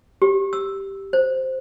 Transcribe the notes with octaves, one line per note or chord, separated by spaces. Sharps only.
G4
E6
C5